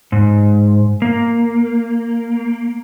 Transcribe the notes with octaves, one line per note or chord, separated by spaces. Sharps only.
G#2
A#3